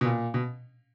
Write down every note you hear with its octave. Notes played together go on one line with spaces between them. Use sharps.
B2
A#2
B2